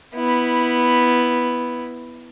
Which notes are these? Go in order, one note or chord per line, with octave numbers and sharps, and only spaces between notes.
B3 E4